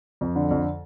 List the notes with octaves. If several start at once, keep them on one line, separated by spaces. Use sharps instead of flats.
F2
D3
F2